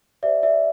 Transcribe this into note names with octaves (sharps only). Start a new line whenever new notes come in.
G4 C5 D5 E5
D5 E5